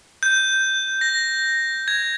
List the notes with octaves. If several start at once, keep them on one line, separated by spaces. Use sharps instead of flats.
G6
A#6
G#6